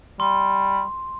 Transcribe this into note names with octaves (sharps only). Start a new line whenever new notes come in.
G3 C6